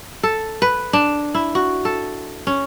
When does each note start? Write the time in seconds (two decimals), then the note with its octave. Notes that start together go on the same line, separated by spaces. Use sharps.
0.23 A4
0.62 B4
0.93 D4
1.35 E4
1.55 F#4
1.85 A4
2.47 C#4